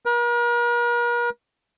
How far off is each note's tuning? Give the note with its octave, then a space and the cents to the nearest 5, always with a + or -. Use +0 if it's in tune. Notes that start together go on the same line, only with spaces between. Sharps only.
A#4 +45